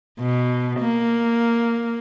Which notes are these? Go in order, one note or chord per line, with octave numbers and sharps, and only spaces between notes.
B2
A#3